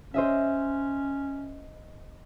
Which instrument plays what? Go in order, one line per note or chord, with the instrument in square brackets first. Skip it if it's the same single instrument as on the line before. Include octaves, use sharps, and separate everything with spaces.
[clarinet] C#4 [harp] C5 D#5 E5